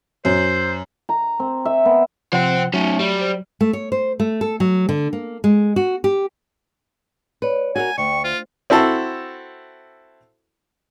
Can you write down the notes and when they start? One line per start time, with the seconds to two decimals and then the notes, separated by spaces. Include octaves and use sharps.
0.25 F#2 C5
1.09 A#5
1.40 C4
1.65 E5
1.85 B3
2.33 C3 F3 C5 F#5 G5
2.74 F#3 A3 C#4 D#4
2.99 G3
3.21 C5
3.61 A3
3.73 C#5
3.92 C5
4.20 A3
4.41 A4
4.60 F#3
4.89 D3
5.13 A#3
5.44 G#3
5.76 F#4
6.04 G4
7.42 B4 C#5 D5
7.76 F#4 A4 A#4 G#5
7.98 D2 D5 G5 C#6
8.24 F4 C5
8.70 C4 E4 F#4 A4 A5